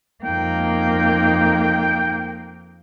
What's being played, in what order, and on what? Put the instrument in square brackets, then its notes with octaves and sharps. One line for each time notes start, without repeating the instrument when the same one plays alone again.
[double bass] F2 D#4 [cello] A#3 [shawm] G5